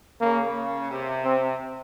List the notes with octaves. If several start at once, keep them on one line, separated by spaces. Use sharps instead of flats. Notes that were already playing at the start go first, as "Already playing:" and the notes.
C#3 A#3
C3
C4